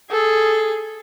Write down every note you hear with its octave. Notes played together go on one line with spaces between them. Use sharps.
G#4 A4